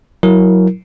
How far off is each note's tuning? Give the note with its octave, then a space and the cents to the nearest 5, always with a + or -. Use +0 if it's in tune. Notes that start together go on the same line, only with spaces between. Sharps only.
F#3 +0 E4 -10 A#4 +0